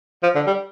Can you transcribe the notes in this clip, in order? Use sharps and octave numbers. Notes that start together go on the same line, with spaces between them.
F3
D3
G3